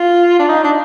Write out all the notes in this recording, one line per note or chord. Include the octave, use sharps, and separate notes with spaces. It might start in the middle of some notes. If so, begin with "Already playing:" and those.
Already playing: F4
D4
D#4
D4